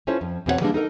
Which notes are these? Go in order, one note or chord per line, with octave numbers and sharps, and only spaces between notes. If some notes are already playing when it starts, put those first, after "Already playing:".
C#4 E4 F4 A4 C5 C#5
F2
E2 B2 C4 F4 C#5 F#5
E3 G3 G#3 A#3 C4 D4
D#4 A4 A#4 D#5